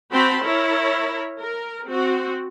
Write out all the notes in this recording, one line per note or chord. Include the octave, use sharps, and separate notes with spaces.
C4 F#4 G5 A5 B5 C6
E4 A#4 C#5
A#4
C4 F#4